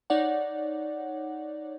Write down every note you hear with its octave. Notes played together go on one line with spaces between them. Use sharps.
D#4 C#5 D5 F#5